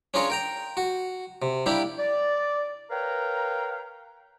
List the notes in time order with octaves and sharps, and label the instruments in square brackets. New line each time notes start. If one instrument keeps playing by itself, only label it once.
[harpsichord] C#4 D4 F4 G#4 A#4 C#5
A#4 G5 A#5
F#4
C3
G3 A#3 D4 E4 G4
[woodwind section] D5
A#4 B4 C#5 F5 G5 A#5